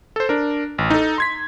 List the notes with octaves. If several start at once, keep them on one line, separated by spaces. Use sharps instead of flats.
A4 C5
D4 A#4
A1
D#4 A4
C6 G#6 B6